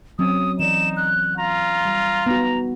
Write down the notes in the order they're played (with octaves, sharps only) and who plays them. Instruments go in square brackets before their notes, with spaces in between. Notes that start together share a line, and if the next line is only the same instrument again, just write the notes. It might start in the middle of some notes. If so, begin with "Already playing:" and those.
[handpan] F#3 C4 C#4 [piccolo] D#6
[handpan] E3 D5 [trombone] D#4 [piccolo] E7
[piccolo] F#6
[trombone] F4 [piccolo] A#5
[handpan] G3
[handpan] B3 D#4 F#4 [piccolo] A#5